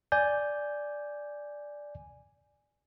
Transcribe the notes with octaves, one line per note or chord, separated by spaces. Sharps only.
D5 G#5 G6